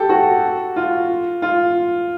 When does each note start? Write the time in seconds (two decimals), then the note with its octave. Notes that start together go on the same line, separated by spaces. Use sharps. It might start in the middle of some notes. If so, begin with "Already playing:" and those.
Already playing: G4 A4
0.09 F#4
0.76 F4
1.42 F4